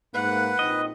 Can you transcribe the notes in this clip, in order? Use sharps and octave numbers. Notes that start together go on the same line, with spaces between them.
G#2 A#3 B4 F#5
A#1 C4 D#4 D#5